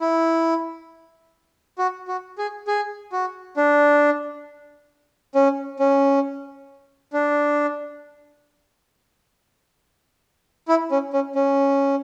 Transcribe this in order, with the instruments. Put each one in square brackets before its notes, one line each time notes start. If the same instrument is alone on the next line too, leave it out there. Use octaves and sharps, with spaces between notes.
[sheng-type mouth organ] E4
F#4
F#4
G#4
G#4
F#4
D4
C#4
C#4
D4
E4
C#4
C#4
C#4